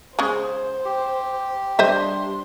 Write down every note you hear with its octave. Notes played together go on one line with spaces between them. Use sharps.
C#3 G#3 C5
G4
G3 D4 C5 D#5 E5 C6